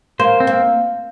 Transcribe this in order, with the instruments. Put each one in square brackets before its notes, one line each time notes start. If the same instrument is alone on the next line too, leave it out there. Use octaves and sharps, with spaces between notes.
[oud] A#3 [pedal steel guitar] C5
[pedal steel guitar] C4
[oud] A#3